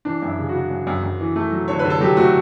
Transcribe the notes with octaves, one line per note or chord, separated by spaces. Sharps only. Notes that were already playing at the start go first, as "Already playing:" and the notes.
E3 D4
F#2
E4
C#3
F#4
C#3
F#2
F#2
F#2
E3
A3
F#3
D3 C#5
B4
D3
A4
F#3 G4
A3 F#4